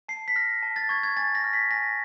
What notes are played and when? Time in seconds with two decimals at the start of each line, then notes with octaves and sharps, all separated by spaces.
0.09 A5 C7
0.28 B6
0.36 F6 A#6
0.63 A5
0.76 A6
0.89 C#6 G#6
1.03 G#6
1.17 G#5 A6
1.35 A#6
1.44 F6
1.53 B6
1.71 G#5 A#6